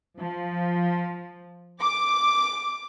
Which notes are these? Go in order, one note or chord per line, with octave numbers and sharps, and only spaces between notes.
F3
D6